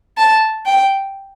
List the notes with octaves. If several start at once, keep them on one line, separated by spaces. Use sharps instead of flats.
A5
G5